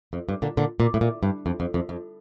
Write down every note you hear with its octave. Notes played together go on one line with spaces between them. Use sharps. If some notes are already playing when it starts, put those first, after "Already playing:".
F2
G2
A#2 D3
A#2 D3
A#2
A2
A#2
G2
F2
F2
F2
F2